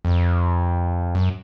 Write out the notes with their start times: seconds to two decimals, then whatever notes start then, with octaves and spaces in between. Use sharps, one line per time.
0.05 F2
1.15 F#2